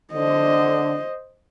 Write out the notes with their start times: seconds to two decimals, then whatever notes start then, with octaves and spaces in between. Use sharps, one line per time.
0.13 D3 C5 D#5